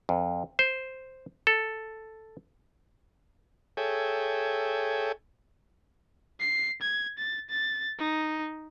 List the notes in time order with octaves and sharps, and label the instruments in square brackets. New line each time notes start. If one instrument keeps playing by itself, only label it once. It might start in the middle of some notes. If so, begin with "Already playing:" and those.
[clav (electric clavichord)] F2
C5
A4
[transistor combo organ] G#4 A4 C#5 E5 G5 G#5
[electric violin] C7
G#6
A6
A6
D#4